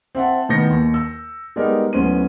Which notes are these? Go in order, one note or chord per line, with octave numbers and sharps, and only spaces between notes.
C4 E5 F#5 A5
A2 D#3 B3 G6 A#6 C#7
D#2
E6
G3 G#3 B3 D#4 G4 A#4
D1 B3 C#4 C5 D#7